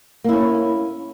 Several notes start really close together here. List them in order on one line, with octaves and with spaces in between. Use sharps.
A#3 E4 C#4